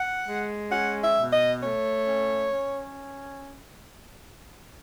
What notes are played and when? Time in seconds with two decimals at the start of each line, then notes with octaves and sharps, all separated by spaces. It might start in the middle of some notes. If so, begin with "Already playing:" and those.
Already playing: F#5
0.26 G#3
0.71 C#4 F#5
1.01 E5
1.16 B2
1.32 D#5
1.62 A3 C#5
2.06 C#4
2.51 C#4